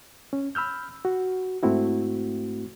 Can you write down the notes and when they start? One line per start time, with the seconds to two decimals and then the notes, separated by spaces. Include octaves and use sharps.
0.33 C#4
0.55 B5 E6 F6 G6
1.05 F#4
1.63 G#2 A3 C4 E4 F#4